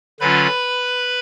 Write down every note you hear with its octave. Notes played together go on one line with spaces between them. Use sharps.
D3 F#3 C#4 F4 B4 B5